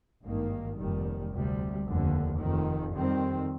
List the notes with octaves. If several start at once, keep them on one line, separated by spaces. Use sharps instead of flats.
G#1 G2 D#3 A#3
F1 D#2 D#3 G3
D2 C3 G3
F1 D#2 D3
F1 F2 D#3
F2 D#3 G3 C4